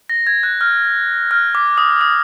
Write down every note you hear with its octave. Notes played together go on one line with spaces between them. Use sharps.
A#6
G#6
F#6
F6
F6
D6
D#6
D#6